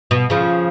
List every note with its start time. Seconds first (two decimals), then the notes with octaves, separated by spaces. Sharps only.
0.11 B2
0.30 C#3 F3